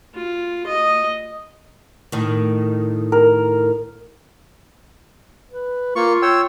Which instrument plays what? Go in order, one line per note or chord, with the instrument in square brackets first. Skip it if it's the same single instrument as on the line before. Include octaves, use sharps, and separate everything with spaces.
[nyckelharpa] F4
D#5
[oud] A2 D#3
[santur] A#4
[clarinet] B4
[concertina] A#3 C#6 [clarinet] F4
[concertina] C#5 G5 E6